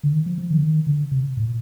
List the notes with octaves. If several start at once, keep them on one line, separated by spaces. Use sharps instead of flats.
D3
D#3
F3
F3
D#3
D3
D#3
D3
C3
A2
A#2